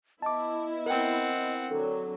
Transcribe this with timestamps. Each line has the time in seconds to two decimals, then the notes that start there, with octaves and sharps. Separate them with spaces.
0.22 B3 E4 D#5 A5 D6
0.86 C4 A#4 F#5 G5
1.70 D3 F#3 A4